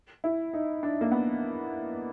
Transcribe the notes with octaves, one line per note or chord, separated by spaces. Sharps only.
E4
D#4
D4
A#3
B3